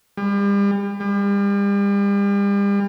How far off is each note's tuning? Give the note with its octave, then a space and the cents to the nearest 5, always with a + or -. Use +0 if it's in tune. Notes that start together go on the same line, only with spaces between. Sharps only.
G3 +40
G3 +40